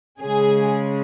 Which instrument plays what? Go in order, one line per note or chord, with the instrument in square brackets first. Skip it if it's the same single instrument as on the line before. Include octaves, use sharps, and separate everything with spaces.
[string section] C#3 G#3 G#4